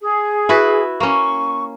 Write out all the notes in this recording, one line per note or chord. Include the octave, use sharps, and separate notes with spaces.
G#4
E4 F#4 B4
A#3 C#4 C#6